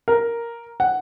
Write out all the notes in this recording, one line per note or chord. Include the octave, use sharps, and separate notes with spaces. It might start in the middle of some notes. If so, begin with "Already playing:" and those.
A#4
F#5